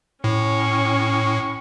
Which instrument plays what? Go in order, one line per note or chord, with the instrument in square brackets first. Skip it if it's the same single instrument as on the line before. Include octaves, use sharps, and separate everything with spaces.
[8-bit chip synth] A2 [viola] C#4 C#6